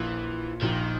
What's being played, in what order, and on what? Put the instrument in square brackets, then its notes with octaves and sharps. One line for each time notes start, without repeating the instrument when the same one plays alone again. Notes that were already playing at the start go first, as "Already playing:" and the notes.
Already playing: [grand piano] A#1 A#2 F3 [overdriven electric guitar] E3
[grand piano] A#1 A#2 F3 [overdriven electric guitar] D#3